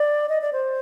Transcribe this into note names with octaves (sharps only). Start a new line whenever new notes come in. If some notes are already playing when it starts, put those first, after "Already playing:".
Already playing: D5
D#5
D5
C5